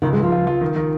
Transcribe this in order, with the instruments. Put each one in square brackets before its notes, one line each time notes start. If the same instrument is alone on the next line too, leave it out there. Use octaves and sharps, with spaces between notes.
[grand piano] C#2 [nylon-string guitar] D#3
[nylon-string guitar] G#3
[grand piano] C#2
[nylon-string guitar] F3
[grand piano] F4
F4
D#3
D#3